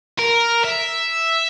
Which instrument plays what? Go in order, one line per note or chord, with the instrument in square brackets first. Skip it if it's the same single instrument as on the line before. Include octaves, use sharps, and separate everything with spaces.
[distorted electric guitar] A#4
E5